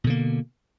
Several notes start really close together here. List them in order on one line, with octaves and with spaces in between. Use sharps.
B2 D3 A#3